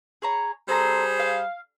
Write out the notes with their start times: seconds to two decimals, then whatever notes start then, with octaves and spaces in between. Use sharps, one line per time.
0.22 G#4 C#5 A#5
0.68 G3 C4 G#4 A4 C5 A#5
1.19 F5